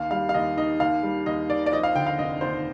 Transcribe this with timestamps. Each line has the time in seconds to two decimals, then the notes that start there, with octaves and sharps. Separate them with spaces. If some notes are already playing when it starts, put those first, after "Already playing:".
Already playing: D#2 F5
0.11 G3 F5
0.29 F5
0.34 D#2 D#5
0.57 D#3 D#5
0.80 D#2 F5
1.03 G3
1.26 D#2 D#5
1.49 D#3 D5
1.66 D5
1.72 F3 D#5
1.83 F5
1.95 D3 G5
2.07 F5
2.19 F1 D#5
2.41 D#2 C5